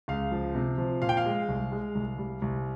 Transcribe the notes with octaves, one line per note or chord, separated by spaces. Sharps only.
C#2 F5
F3
C3
F3
A#2 F5
G5
F5
G#3
C2
G#3
C2
G3
C2